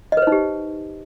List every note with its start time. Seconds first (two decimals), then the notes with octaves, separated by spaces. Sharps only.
0.12 D#5
0.17 B4
0.22 C5
0.27 D#4
0.32 G4